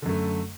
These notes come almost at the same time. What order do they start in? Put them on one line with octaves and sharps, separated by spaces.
D3 F#2 A3